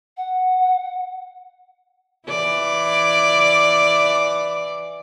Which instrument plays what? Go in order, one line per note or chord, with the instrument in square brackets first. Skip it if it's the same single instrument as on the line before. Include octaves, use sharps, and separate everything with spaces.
[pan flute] F#5
[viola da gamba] E3 D5